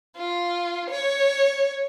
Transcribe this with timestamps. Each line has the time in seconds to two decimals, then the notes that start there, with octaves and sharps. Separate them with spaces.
0.17 F4
0.90 C#5